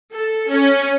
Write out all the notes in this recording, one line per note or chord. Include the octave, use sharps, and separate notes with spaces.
A4
C#4